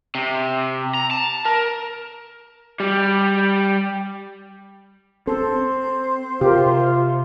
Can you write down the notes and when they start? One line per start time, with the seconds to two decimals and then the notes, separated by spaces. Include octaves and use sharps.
0.15 C3
0.94 A#5
1.11 A5
1.45 A#4
2.80 G3
5.27 C4 C#4 A4 C5
6.41 C3 F4 G4 A#4